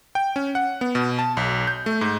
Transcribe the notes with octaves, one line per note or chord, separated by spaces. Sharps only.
G5
C#4
F#5
B3
B2
A5
B1
G6
A3
G#2